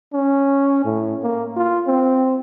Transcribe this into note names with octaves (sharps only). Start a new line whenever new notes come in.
C#4
A2
A#3
F4
C4